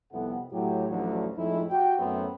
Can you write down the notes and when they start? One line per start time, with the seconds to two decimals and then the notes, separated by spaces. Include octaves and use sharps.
0.12 C2 F2 C3 B3 A4 F#5
0.52 A2 F#3 G4
0.88 A1 D2 D3 F3 F#3
1.36 F2 A2 G#3 D#4 E4
1.70 F#4 G4 G5
1.98 F#2 A2 F#3 A3 B3 C4